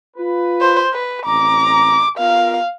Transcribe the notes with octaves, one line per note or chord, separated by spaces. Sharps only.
F4 B4
C5
B4
A1 C4 A#5 D6
B3 F4 A#4 F5